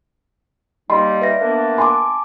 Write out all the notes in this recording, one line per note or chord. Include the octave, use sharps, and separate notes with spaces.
G3 A#3 D#4 D#5 C6
B4 E5 A#6
A#3 B3 D4
G#5 A5 C6 D6